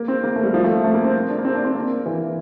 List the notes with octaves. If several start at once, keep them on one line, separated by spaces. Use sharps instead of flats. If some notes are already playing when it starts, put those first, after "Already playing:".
Already playing: A#3
C4
A#3
A3
G3
F3
A3
A3
A#3
C4
D4
A#3
C4
D4
C4
A#3
E3